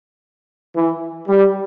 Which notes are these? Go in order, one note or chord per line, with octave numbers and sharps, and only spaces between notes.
E3
G3